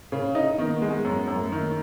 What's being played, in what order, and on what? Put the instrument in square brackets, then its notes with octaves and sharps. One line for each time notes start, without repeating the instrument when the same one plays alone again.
[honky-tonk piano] C#3
D#4
[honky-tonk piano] D#3 [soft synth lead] B3
[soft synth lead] A#3
B3
[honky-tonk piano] G#3
F#2
F#2
[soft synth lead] A3
[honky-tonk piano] D#3 [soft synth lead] A#3